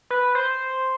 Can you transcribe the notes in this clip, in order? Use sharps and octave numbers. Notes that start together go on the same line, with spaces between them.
B4
C5